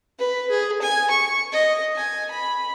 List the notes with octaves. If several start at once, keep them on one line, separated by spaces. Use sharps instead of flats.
B4
G#4
G#5
C#6
D#5
G#5
B5